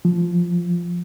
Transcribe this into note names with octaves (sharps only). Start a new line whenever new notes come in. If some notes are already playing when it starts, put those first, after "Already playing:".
F3